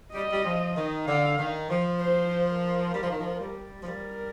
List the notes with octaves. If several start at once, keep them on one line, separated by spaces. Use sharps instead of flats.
G3 D#5
G3
F3
D#3
D3 F5
D#3
F3
C5
A#4
G3
F3
D#3
F3
G3
F3
G3 A#4